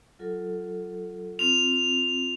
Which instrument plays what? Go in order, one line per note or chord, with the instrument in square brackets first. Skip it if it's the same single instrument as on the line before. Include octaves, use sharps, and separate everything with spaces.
[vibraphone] F#3 F4 A4
[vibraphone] C4 F4 [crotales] F7